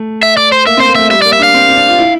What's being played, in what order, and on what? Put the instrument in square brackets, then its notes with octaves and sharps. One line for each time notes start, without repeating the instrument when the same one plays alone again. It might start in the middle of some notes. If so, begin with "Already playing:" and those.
Already playing: [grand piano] A3
[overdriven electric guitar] E5
D5
C5
[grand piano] A#3 [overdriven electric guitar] E5
[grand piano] C4 [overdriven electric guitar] C5
[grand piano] A#3
[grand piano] A3 [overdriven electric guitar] E5
[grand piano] G3 [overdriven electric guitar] E5
[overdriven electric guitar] D5
[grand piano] A#3
[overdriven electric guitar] E5
[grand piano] D4 [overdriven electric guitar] F5
[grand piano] C4
C4
D4
F4
E4